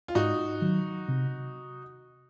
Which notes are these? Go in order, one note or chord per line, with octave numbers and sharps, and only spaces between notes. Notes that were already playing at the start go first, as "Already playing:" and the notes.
F4
G#2 D#4 F#4
D#3 F#3
C3